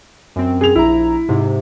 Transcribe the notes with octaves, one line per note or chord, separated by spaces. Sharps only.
F#2 C4
G#4 F7
A#1 E4 A#5
G#2 C3